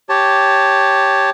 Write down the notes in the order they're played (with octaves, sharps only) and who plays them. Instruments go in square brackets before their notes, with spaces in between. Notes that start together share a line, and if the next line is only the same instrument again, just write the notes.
[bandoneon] G4 C#5 A5